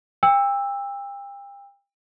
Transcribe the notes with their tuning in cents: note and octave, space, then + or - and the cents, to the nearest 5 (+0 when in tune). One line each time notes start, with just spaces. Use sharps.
G5 +35 E6 +0